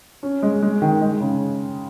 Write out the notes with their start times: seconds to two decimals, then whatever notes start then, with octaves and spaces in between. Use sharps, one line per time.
0.23 C#4
0.42 G#3
0.62 G#3
0.82 D#3
1.01 G#3
1.20 C#3